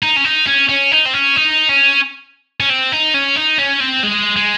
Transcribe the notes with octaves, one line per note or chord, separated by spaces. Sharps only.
D#4
C#4
D#4
C#4
C#4
D#4
C4
C#4
D#4
C#4
C#4
C4
D#4
C#4
D#4
C#4
C4
G#3
G#3